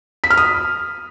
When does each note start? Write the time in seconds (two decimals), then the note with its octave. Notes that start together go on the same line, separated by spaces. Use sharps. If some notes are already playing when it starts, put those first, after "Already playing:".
0.24 B6
0.30 F6
0.37 D#6